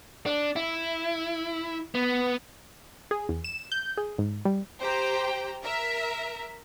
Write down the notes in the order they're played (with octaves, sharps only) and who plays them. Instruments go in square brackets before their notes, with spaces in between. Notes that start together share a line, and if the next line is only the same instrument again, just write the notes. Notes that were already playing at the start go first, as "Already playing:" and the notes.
[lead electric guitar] D4
E4
B3
[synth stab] G#4
E2
E7
G6
G#4
G#2
G3
[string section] G4 C5 G5 A#5
A#4 E5